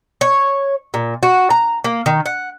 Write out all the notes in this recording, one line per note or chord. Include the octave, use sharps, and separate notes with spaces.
C#5
A#2
F#4
A#5
A#3
D#3
F#5